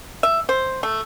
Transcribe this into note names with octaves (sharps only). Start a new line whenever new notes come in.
E5
C5
A3